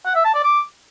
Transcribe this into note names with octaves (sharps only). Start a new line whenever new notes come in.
F#5
E5
A5
D5
D6